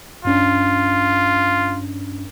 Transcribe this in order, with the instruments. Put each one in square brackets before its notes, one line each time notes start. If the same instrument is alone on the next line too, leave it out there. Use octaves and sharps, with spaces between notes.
[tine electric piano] G2 C#4 D4 [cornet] F4